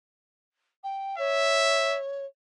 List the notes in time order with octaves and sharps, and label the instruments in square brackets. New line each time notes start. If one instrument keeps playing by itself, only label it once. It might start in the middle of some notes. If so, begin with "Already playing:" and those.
[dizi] G5
[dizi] C#5 [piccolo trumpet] E5